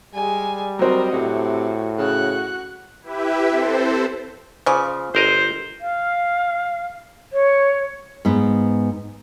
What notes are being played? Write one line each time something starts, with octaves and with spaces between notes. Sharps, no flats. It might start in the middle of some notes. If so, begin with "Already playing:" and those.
G3 G#3 G#5
F#3 C4 A#4 D#5
A2 C3 F#4
C#3 F#4 F#6
E4 G4 B4 E5
C4 A4 C5
C#3 F3 D5 G#5
G1 A#4 C5 D#5
F5
C#5
G#2 B3